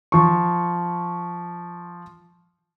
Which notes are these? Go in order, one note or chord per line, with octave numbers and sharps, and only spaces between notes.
F3 C#6